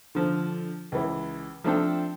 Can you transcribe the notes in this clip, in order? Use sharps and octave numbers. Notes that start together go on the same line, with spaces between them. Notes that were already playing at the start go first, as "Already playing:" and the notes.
D3 F3
C#2 E3
F3 A3 C4 D4 A4 G5